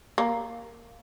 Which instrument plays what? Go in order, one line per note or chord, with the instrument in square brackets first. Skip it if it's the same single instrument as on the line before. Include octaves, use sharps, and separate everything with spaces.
[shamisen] A#3